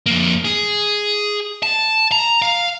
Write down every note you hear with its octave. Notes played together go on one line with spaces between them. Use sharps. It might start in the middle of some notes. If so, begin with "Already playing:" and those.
F2 A#3
G#4
A5
A#5
F5